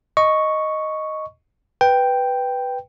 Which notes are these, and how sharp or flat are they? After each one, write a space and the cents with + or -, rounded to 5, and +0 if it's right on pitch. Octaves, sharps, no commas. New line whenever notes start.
D#5 +0 C#6 +0
B4 +0 G5 +0